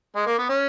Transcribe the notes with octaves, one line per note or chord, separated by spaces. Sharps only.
G#3
A#3
B3
C#4